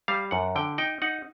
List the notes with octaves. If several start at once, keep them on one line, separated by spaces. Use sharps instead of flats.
G3 F5
F#2 F#5
D3 G5
D#4 G5
D#4 F#5